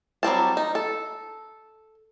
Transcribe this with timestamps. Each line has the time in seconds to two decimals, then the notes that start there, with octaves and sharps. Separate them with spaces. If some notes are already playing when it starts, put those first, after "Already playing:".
0.23 F#3 G3 C4 A5
0.57 D#4
0.75 A4